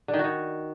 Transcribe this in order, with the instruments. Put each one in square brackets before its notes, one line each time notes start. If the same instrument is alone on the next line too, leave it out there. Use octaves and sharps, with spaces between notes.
[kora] D3
D#3
F#4
D#3